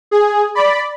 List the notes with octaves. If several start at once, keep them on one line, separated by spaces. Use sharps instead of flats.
G#4
D5 B5